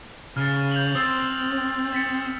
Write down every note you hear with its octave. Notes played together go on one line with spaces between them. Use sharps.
C#3 F6 A6
G6 F7 F#7
C4 D#6 E6 A6
A6 B6 C#7